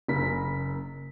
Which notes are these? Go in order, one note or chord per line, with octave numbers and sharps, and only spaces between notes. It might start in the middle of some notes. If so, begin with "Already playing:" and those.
F#1 C#3 A#4 B6